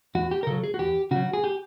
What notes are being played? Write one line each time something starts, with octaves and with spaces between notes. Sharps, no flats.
E2 F#4
G4
A#4
C#3 F#3 A4
G#4
F#4
E2 G4
C#3 F#3 F#4
G#4
G4